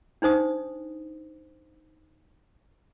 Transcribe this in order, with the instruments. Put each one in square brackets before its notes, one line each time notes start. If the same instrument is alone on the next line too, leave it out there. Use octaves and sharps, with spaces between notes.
[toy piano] D4 D#4 C5 D#6